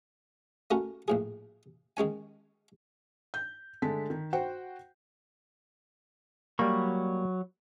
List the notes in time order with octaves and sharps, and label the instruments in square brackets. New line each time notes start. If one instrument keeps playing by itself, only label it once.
[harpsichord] A3 C#4 F#4 A#4
A#1 A2 G#4
D#3 G#3 C#4 G#5
[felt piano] G6
D3 G#3 A3 A5 B6
D#3
F#4 C5 F#5 G5
[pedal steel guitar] F#3 B5 C#6 [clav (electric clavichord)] G3 A#3